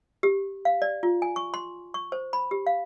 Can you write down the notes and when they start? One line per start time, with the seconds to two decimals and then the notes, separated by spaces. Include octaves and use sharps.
0.23 G4
0.65 F5
0.82 D5
1.03 F4
1.22 G#5
1.36 C#6
1.54 C6
1.94 C#6
2.12 C5
2.33 B5
2.51 G4
2.67 F5